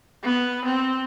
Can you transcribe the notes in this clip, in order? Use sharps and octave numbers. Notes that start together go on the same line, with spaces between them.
B3
C4